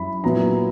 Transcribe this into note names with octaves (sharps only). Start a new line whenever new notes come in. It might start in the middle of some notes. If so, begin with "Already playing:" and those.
Already playing: F#2 E4 B5
A#2 F#3 B3 E4 A#5